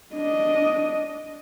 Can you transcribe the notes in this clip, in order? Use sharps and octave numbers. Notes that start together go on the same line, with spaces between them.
D4 D#5